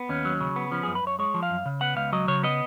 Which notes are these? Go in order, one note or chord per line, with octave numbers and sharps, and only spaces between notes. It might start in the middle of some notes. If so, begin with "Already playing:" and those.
Already playing: B3
D#2 C#4
F#3
C#3
B3
F3 C#4
F#2 G#4
B4
F#2 C#5
G#3 C#5
F3
F5
F#2
C#3
B3 F#5
C#2 F5
F#3 D#5
C#3 C#5
B3 D#5